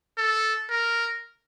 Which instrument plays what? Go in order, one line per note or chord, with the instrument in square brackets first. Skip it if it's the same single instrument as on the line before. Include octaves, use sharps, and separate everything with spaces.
[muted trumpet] A4
A#4